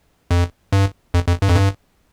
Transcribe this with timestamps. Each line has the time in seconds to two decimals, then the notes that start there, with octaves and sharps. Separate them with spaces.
0.31 F2
0.72 G2
1.14 F2
1.28 F2
1.42 G2
1.49 F2
1.56 G2